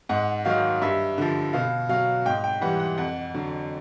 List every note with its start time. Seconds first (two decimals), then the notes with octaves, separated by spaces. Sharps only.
0.09 G#2 F#5
0.45 D#3 F#3 F5
0.81 G2 E5
1.18 D3 F3
1.53 B2 F5
1.89 F#3 F5
2.25 G#2 G5
2.44 G5
2.61 E3 G3 F#5
2.80 F#5
2.97 F2 F#5
3.34 D3 F#3